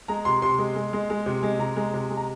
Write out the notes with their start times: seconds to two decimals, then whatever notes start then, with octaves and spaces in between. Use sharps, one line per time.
0.08 G#3 A#5
0.25 C3 C6
0.42 C3 C6
0.58 G#3
0.76 G#3
0.93 G#3
1.10 G#3
1.26 C3
1.43 G#3
1.59 C3 A#5
1.76 G#3
1.94 C3
2.10 G#3
2.17 A#5